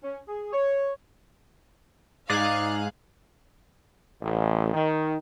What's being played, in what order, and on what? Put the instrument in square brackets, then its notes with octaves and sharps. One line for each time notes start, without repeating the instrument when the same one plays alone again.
[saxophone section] C#4
G#4
C#5
[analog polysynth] G#2 G#4 F#6 [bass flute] D#4 [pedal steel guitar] D5 [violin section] F5
[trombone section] A1
D#3